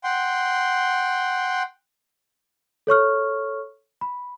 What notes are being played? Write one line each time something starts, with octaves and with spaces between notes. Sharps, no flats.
F#5 G5 C6
A4 C#5 C#6 F6
B5